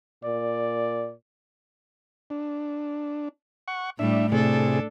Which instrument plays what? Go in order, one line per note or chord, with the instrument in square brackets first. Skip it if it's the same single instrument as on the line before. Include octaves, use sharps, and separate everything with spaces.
[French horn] A#2 [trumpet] D5
[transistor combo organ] D4
F#5 C#6
[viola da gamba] A2 G3 A3 [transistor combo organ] D4 E5
[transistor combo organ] A2 C3 G#4 [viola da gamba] D4 A4